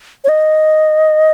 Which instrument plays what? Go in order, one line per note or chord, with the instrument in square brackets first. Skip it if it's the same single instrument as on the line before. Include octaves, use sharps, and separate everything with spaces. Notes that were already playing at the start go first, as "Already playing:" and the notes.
[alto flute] C#5
D#5